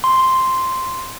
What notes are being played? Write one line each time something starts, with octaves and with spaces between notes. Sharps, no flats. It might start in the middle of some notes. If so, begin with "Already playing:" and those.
C6